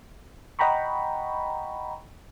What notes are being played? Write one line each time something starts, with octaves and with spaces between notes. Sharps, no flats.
D#5 F#5 G5 A#5 B5 C#6